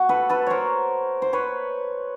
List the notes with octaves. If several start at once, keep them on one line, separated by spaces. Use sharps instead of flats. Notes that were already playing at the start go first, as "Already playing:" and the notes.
Already playing: F#4
A4 B4
A4 B4
A#4 C5 C#5
C5
B4 C#5